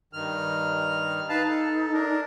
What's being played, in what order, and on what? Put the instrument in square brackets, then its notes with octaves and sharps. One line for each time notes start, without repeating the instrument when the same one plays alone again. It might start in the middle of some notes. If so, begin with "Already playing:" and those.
[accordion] G2 D#3 F6
[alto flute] D#4 [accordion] B4 F5 A5
[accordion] A4
D4 A#4